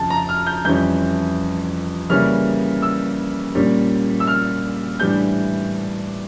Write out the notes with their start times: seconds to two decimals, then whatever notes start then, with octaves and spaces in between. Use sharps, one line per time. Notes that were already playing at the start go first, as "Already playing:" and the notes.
Already playing: F2 C#3 A5
0.10 A#5
0.29 F6
0.47 G6
0.65 F2 E3 G3 C#4 G6
2.10 C#3 E3 G3 A#3 C#4 F6
2.82 E6
3.55 A#2 G3 A#3 C#4
4.20 E6
4.27 F6
5.00 A2 E3 G3 D4 G6